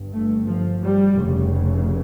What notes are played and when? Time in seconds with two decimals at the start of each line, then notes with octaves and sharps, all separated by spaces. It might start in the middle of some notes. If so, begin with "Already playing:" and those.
Already playing: G1 G2
0.13 A3
0.48 F3
0.81 G3
1.15 F1 F2 C#3